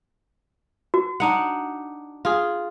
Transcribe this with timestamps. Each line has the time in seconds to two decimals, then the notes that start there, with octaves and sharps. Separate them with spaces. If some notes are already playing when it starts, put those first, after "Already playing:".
0.94 F#4
1.20 D4 D#4 F#5
2.25 F4 G#4